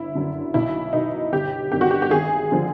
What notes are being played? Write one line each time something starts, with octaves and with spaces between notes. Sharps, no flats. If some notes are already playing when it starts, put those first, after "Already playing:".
Already playing: G1 E4
F#2 D3
B1 E4
B2 D#4
G1 G4
G2 D#3 G4
F#4
G4
G4
G#1 G#4
D3 F3